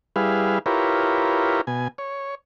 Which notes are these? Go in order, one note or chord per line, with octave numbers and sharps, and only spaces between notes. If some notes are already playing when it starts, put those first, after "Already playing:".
G3 E4 G#4 B4 F5
E4 F4 G4 A#4 B4 C#5
B2 G#5
C#5